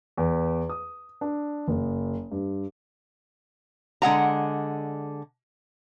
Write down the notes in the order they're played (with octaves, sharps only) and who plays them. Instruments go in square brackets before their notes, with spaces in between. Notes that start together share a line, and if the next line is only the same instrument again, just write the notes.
[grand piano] E2
D#6
D4
F#1
G2
[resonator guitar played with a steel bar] D3 G#3 F#5 A#5